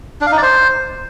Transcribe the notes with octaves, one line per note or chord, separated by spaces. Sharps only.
D4
F5
D#4
D5
C5